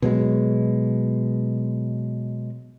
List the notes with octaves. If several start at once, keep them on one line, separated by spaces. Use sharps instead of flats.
B2 F#3 G#3